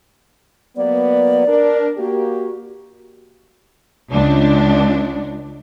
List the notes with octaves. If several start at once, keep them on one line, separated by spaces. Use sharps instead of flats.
F#3 A#3 B3 D5
D4 A#4
A#3 F#4 G4
C#2 D4